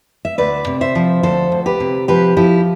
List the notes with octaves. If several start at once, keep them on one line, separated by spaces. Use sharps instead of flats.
E5
D2 B4 D5
C3
C5 E5
F3
D2 A4 C5
D2
G4 B4
C3
F3 G4 B4
F3 E4 G4